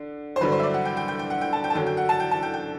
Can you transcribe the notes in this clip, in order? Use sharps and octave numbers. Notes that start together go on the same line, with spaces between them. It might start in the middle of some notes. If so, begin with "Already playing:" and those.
Already playing: D3
C5
G2 D3 F#3 B4
C5
E5
D5
F#5
G5
G5
G5
G5
F#5
G5
A5
G5
A5
F#2 D3 F#3 G5
G5
F#5
A5
G5
A5
G5
G5